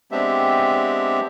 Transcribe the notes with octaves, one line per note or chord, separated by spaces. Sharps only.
G#3 B3 C4 D4 G4 E5